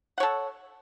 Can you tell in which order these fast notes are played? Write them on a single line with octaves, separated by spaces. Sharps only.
F#5 C#5 A4